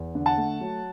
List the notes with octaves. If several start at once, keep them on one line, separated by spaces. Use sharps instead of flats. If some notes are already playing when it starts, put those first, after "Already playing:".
Already playing: E2
D3
F#5 A5
A3
F#3